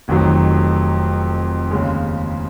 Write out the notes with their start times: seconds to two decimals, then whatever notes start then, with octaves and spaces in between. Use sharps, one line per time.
0.08 F1 F2 D#3 F#3
1.71 D#2 C#3 G#3